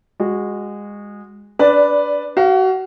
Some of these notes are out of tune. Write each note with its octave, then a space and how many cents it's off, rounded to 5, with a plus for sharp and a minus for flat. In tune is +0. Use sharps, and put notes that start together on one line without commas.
G#3 -20 F#4 -5
D4 -15 B4 +0 D5 +0
F#4 +30 F5 -5